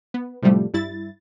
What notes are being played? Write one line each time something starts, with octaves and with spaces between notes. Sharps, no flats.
B3
A2 C3 F3 G3 A3
G2 E4 A6